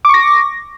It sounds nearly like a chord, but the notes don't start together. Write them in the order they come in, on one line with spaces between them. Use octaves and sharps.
D6 C#6 A#6